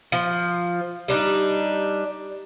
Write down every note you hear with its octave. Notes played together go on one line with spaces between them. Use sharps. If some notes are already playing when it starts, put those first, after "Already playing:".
F3
G3 D4 D#4